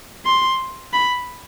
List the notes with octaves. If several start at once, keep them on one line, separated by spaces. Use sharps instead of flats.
C6
B5